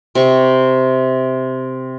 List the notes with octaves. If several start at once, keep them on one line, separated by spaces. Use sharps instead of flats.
C3 C#6